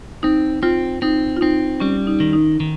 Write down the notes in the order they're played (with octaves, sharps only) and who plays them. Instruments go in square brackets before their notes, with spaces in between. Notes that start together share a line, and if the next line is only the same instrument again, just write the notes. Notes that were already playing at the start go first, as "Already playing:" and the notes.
[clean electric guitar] C4 [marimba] D#4
[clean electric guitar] C4 [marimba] F4
[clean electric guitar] C4 [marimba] D#4
[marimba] F4
[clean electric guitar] C4 [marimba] D#4
[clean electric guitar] G3 [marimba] C#4
[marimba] D#4
[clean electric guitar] D#3
[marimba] D#4
[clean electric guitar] D#3